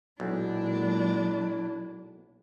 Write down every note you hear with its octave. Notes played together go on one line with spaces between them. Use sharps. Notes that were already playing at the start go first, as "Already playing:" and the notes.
B1 A#2 F#3 G#3 D4 E4